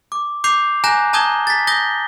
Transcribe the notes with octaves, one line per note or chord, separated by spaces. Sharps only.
D6
D6 G6 C7 F7
G#5 A#5 F#6 G6 A#6 E7
A5 A#5 D#6 G6 G#6 G7
A6 B6
D#6 G6 A#6 G7